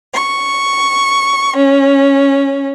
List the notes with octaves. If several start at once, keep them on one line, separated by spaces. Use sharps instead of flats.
C#6
C#4